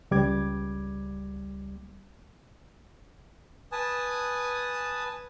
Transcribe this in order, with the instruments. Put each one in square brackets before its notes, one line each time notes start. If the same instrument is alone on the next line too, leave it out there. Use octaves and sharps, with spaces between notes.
[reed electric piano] C#2 G3 D6 G#6
[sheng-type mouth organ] B4 G#5 A5 D#6